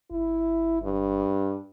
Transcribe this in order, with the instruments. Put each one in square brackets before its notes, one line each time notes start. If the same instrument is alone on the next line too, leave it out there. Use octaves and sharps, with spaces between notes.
[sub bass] G1 [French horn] E4
[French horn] G2